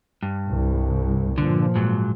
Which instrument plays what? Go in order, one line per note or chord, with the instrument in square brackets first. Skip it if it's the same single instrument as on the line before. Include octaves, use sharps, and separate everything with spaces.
[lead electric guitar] G2
[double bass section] C2
[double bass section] G2 A#2 F3 [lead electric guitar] D3
[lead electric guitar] G#2 F#3